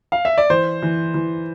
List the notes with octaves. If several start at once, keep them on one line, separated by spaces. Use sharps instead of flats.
F5
E5
D5
E3 C5
E3
E3